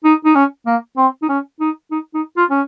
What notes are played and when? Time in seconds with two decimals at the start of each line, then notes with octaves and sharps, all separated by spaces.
0.04 D#4
0.25 D#4
0.35 C#4
0.67 A#3
0.97 C4
1.23 D#4
1.29 C#4
1.60 D#4
1.91 D#4
2.14 D#4
2.37 F4
2.51 C#4